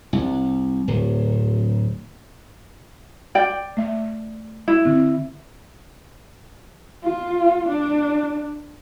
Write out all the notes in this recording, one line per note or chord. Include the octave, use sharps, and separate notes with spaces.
C2
D1
D5 G5
A3 E5
E4
D3 C4
F4
D4